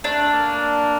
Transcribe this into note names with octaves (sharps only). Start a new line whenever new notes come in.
A3 D4
A#3